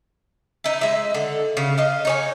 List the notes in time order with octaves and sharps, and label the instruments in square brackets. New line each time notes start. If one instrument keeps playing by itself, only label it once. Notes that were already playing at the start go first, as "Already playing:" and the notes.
[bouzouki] D#4 E4
G#3 E5
D3
C#3
D#5 F5
D#4 C#5 G#5